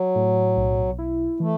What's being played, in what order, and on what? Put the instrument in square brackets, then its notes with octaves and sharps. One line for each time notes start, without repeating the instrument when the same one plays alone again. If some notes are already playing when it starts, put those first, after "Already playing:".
Already playing: [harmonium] F#3
[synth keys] A2
B1
E4
[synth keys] E3 [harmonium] A3